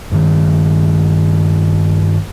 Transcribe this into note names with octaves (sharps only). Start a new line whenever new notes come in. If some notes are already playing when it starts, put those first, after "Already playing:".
G2 D#3